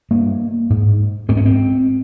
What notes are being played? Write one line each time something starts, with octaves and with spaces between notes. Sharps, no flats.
G2 A#3
G#2
G#2 C4
C#4
C4